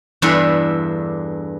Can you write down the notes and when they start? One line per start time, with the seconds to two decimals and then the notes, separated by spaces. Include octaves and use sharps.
0.22 E2 G2 D4 A4 E5 B5